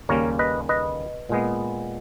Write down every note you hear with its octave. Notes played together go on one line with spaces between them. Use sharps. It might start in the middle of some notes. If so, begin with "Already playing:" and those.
D#2 C#3 G3 A#3 C#4 A#4 C#5
B4 D#5
B4 D#5
A#2 G#3 B3